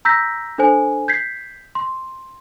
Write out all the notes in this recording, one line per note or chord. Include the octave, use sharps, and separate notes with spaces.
A#5 E6 G6 A#6 B6
D4 A4 C5 G#5
G6 G#6 B6 C7
C6